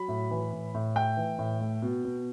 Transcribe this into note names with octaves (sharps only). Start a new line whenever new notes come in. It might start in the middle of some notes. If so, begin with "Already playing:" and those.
Already playing: F#3 B5
A2
E3
A2
A2
A3 G5
E3
A2
A3
B2
B2